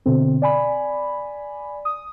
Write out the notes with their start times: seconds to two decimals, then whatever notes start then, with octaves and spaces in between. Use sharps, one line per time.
0.06 B2 D3 C4
0.42 D5 G#5 B5
1.85 D#6